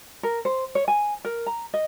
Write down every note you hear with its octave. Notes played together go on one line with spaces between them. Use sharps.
A#4
C5
C#5
G#5
A#4
A#5
D#5